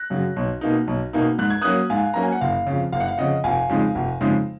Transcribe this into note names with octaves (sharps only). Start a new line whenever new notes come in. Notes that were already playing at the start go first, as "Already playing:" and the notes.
Already playing: F#6 A#6
F#2 C#3 F#3
B1
B2 A#3 D#4
B1
B2 A#3 D#4
G#2 F#6
G#6
F#3 A#3 C#4 D#6 F#6
G#2 F5 G#5
F#3 A#3 C#4 A#5
G#5
F#5
F#1 F5
F2 C#3
F#1 F5
F#5
F5
F2 C#3 D#5 F#5
F1 F5 G#5
F2 C#3 G#3 D#4
F1
F2 C#3 G#3 D#4